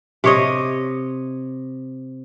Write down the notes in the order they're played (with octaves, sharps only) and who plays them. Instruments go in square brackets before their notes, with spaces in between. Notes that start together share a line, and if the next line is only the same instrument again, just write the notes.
[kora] C3 C#5 D#5